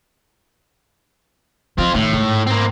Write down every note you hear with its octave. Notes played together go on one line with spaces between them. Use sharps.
F3 C4 F4
A2 D#3
G#2
A#3 C4